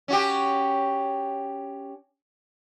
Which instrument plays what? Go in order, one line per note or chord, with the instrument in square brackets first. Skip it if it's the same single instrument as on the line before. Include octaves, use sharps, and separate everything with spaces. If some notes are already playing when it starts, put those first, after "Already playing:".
[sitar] C#4 F#4 G4